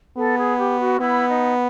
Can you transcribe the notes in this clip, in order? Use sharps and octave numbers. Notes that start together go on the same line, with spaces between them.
B3 A4
G#4
G4
F#4
B3 E4
D#4